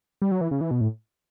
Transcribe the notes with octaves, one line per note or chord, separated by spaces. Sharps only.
G3
F#3
E3
C#3
E3
B2
A2